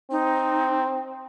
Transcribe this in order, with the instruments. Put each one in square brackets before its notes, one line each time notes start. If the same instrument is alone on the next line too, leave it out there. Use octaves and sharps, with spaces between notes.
[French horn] C4 [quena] D#4